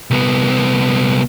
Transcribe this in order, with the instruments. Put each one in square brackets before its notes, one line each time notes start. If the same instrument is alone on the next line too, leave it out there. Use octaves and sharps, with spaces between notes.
[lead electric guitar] C2 B3